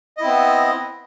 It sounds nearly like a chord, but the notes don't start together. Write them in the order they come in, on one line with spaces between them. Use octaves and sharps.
D#5 E4 C4 B3